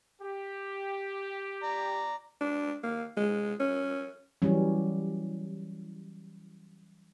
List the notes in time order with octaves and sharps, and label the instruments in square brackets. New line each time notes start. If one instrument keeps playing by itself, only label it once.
[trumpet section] G4
[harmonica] D5 A#5
[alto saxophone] D4
A#3
G#3
C#4
[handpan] E3 F#3 G3 C#4